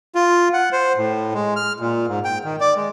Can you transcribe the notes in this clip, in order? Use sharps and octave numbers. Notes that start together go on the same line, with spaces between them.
F4
F#5
C5
A2
G#3
F6
A#2
G#2
G5
D#3
D5
G#3